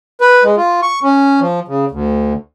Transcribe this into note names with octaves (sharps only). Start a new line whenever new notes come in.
B4
G#3
F4
C#6
C#4
F3
C#3
D2